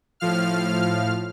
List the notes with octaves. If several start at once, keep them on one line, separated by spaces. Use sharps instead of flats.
A2 F3 F5 F6